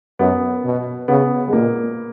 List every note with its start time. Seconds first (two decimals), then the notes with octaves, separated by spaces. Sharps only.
0.19 F#2 B3
0.65 B2
1.08 C#3 B3
1.48 G#3
1.53 A#2 A#3